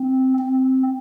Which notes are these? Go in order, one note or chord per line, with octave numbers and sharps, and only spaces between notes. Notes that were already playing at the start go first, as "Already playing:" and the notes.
Already playing: C4
C4